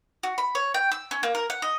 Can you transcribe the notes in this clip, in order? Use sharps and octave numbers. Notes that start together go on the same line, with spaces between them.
F#4
B5
C#5
G5
E6
C#4
A#3
A#4
F#5
D#5